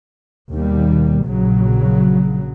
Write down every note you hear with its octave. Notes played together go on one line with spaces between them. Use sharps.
D#2 B2 G3
A#1 C#3 F#3